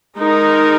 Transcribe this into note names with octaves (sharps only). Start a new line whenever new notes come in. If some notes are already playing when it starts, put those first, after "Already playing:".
G#3 D#4 A#4